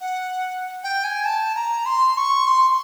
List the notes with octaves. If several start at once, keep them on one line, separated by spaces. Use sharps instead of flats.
F#5
G5
G#5
A5
A#5
C6
C#6
C6